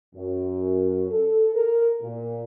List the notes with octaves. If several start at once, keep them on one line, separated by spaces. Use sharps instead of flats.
F#2
A4
A#4
A#2